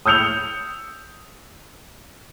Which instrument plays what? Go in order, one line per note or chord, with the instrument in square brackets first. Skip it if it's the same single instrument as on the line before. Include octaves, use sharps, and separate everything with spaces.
[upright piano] D#6 E6 G6 C#7 F7